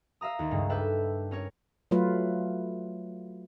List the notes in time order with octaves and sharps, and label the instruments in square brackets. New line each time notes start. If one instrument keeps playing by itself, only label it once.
[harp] E5 F5 A#5 D#6
D#2
C#2 G2 G#3
D4 A4 B4 E5 G5
C#4 A#4 C#5
[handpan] F#3 A3 F4 B4